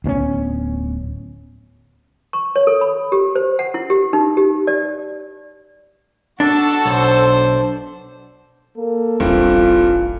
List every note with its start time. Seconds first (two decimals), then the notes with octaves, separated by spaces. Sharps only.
0.04 D1 G2 B3 C#4
2.33 C#6
2.56 C#5
2.67 A4
2.81 B5
3.12 G4
3.35 C5
3.59 F#5
3.74 E4
3.90 G4
4.13 D#4
4.37 G4
4.67 D5
6.40 D4 F#4 A4 A5
6.85 B1 D4 C5
8.77 A#3 A4
9.20 D#1 A1 G2 E3 C4 F4